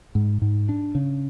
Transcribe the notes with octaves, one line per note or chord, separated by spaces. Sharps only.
G#2
G#2
D4
C#3